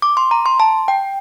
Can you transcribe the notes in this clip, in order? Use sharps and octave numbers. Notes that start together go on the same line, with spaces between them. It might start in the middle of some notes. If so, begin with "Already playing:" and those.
D6
C6
A#5
C6
A5
G5